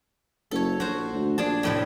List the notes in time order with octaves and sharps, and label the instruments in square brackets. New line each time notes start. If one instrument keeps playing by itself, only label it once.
[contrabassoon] F#1 [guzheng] A4 C#5
[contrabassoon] A#1 [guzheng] F#4 C5
[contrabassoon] D2
[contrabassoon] A#1 [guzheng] D4 G#4 A5
[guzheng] F2 A2 C3